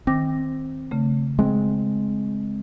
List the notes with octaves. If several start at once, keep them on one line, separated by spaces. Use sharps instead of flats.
D#3 C4 D6 A#6
C#3 A3
G#3 C4